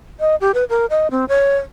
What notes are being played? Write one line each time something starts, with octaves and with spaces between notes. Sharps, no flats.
D#5
G4
B4
A#4
D#5
C4
C#5